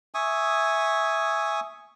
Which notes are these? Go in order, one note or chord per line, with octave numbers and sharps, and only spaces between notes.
E5 G#5 C#6 D#6